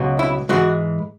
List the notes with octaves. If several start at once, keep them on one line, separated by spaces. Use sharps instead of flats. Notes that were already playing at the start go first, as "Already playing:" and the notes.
Already playing: C#2 B2 F#3
E4
G#2 E3 G#3 F#4